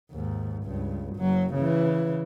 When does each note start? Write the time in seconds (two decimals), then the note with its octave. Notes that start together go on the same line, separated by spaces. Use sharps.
0.11 D#2 G#2
0.64 C#2 G2
1.16 F#1 F#3
1.54 C#3 E3